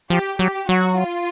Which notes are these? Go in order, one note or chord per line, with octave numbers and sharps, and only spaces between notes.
F3 G4
F#3 G4
F#3 F#4
F4